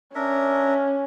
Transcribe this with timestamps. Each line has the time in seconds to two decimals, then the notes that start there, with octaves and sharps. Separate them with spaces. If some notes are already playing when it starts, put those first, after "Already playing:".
0.15 C#4 D4 A#4 E5